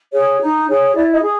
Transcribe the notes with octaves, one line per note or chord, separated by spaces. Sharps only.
G#4 C#5
D#4
G#4 C#5
E4 D5
D#5
G#4